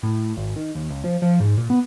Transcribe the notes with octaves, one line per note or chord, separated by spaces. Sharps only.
A2
G#1
D#3
D#2
C#2
F3
F3
G#2
A#2
B3